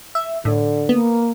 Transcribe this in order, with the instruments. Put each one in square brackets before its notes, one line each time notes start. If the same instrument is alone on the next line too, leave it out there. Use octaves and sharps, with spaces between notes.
[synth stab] E5
[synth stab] A2 [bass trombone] D3
[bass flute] A#3 [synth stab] B3